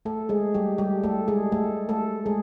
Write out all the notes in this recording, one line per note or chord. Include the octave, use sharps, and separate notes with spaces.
A3 A4
G#3 G#4
G3 G4
G3 G4
A3 A4
G#3 G#4
A3 A4
A3 A4
G#3 G#4